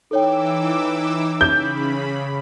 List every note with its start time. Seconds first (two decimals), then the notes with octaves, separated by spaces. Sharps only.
0.11 E3 D#4 A4 C#5 G5 D6 E6
1.41 C#3 B5 G6